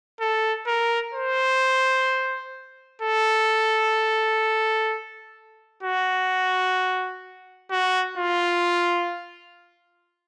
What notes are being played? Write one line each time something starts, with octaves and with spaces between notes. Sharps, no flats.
A4
A#4
C5
A4
F#4
F#4
F4